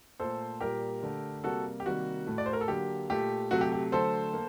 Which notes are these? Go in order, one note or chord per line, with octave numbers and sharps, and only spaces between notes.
A#2 A3 A4 C5
A#2 G3 A#3 G4 A#4
D3 A3
C3 G3 A#3 F#4 A4
G4
C3 D#3 G3 A#3 F#4
A2 A3
D5
C5
A#4
A4
D3 F#3 A#3 G4
A#2 A3 G4
C3 F#3 A3 F#4
G4
G4
D3 F#3 A3 A4 C5
A#3